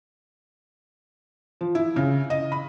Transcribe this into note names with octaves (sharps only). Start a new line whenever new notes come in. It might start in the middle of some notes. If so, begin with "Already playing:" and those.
F3
E4
C#3
D#5
B5